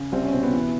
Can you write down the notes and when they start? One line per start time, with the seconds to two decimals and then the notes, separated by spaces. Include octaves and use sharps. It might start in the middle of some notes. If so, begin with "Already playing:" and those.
Already playing: C#3
0.12 C2 C4
0.24 C#4
0.33 B2 C4
0.43 B3
0.53 E3